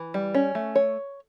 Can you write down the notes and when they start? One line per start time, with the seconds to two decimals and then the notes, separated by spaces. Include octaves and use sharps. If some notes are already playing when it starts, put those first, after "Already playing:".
Already playing: E3
0.14 G3
0.34 C#4
0.55 A3
0.75 C#5